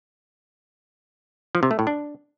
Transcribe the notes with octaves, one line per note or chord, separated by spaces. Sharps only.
F3
C3
A3
A2
D4